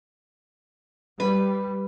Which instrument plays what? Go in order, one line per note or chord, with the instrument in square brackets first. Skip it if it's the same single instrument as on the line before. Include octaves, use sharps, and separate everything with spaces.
[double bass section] G3 [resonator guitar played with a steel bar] B4